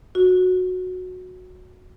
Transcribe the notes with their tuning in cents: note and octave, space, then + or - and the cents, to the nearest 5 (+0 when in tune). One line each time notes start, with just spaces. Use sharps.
F#4 -15